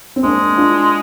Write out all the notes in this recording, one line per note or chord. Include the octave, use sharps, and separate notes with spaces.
C4
G#3 A#3 D4
D4 F4